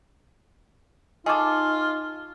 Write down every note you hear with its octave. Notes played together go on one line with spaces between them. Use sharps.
D#4 F4 G#4 A4 D#5 C#6 D6